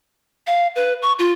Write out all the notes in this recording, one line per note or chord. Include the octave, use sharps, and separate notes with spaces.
F5
B4
C#6
F4